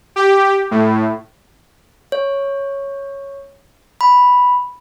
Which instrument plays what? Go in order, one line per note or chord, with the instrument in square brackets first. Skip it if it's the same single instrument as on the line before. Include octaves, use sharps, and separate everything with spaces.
[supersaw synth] G4
A2
[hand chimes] C#5
B5